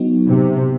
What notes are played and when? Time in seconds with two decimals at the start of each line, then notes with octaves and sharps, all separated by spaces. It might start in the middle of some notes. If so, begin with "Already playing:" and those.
Already playing: F#3 B3 D#4 F#4
0.28 C3